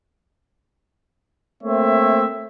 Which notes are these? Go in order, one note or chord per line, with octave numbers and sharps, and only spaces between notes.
A3 A#3 C4 C#5 E5